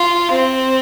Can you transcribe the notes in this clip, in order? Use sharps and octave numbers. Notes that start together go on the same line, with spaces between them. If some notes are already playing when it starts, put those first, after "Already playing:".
Already playing: F4
C4